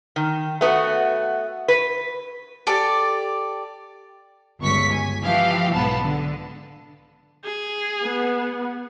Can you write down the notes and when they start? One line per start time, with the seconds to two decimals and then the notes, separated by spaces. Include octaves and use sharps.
0.16 D#3
0.61 A3 B3 F#4
1.68 B4
2.67 G4 A4 D5 D6
4.60 G1 C#2 C#6 B6
4.91 G#5
5.24 E3 F3 G4 F5
5.74 B1 G#2 B3 A5
6.03 D3
7.44 G#4
8.05 B3